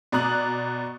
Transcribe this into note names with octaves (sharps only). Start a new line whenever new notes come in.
B2 D5 A#5 D#6 F#6 F#7